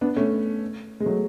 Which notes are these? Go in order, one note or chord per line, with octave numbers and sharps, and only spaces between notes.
B3 D4
A3 C#4
G#3
F#3 A3